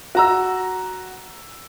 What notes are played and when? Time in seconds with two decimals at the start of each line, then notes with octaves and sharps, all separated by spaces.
0.15 F#4 A#5 E6